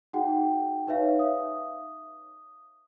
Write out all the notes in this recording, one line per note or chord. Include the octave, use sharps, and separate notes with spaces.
D#4 F#4 G#4 F#5 G5
D#4 B4 C#5 E5 F5
D#6